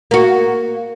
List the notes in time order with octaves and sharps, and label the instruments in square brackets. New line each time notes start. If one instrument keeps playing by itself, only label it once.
[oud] A#3 F#4